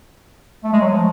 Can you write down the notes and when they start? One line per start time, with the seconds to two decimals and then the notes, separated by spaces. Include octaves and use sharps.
0.64 A3
0.73 G#3
0.82 F#3
0.91 F3